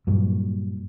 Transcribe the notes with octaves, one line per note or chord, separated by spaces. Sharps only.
G2 A#2 F#3